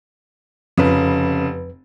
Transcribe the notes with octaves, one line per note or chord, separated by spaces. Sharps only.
F1 F2 C#3 B4